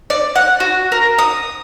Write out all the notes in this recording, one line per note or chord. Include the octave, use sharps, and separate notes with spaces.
D5
F#5
F#4
A#4
D#6